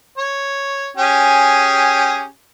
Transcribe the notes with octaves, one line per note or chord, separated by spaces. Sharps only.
C#5
C#4 G4 G#4